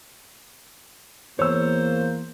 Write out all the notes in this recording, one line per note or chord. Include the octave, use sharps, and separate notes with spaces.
E2 A#3 C5 C#5 E6